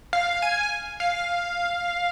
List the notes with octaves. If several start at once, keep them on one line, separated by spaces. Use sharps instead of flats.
F5
G#5
F5